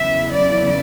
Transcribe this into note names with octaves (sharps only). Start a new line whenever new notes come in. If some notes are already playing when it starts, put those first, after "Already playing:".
Already playing: E2 C#3 F#3 B3 E4 E5
D5